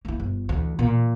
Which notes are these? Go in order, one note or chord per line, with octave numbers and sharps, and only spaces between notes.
A#3 E4
G1
D2 E3
A#2